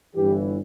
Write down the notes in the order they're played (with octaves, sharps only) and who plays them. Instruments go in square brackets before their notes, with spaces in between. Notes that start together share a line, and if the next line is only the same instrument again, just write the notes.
[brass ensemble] G1 G2 E3 G4